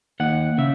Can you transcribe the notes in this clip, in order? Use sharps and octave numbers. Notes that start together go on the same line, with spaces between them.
D#2 F#5
C#3 E5